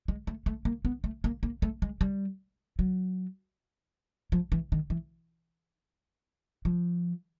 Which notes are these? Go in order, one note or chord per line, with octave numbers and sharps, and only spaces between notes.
G#3
A3
A3
A#3
B3
A3
A#3
A#3
A3
G#3
G3
F#3
F3
E3
D#3
E3
F3